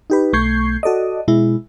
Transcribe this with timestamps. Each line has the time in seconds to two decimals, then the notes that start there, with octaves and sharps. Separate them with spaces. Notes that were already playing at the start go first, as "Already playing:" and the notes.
0.10 D#4 G4 B4
0.33 B1 A3 C#6 G6 G#6 C7
0.83 F#4 A4 D5 D#5
1.28 B2 G#3 E4